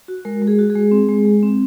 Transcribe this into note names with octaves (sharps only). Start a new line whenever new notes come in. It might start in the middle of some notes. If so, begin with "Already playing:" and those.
F#4
G#3 A#4
G#3
G#4
F#4
G#4
G#3
C4
G#3
G#3
C4